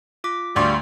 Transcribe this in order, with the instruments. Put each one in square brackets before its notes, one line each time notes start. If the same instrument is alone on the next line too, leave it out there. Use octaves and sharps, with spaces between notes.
[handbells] F4 D6 B6
[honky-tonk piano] D2 [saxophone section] G3 [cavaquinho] F5 C6 C#6